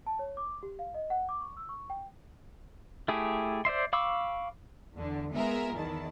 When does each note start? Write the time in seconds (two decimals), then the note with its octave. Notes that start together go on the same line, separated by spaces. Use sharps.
0.06 A5
0.19 C#5
0.37 D6
0.63 G4
0.79 F5
0.94 D#5
1.10 F#5
1.29 D6
1.41 C#6
1.57 E6
1.69 C#6
1.90 G5
3.08 A3 E4 G4 G#4
3.65 C5 D5 E5 C6
3.93 F5 B5 C#6 D6 E6
4.95 E2 D3
5.33 G#3 B3 F4 G#4 A#4 E5
5.74 E2 D#3 E4 A5